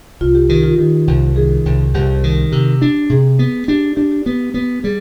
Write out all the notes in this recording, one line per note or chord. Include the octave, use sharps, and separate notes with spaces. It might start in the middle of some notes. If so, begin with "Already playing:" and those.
C2 F4
G4
D#3 G4
F4
D#3 G4
C2
D#3 G#4
C2
C2 G4
D#3
C3 G4
D4
C3 G#4
B3
D4 G4
G4
D4 G4
G4
B3 G4
B3
G3 G#4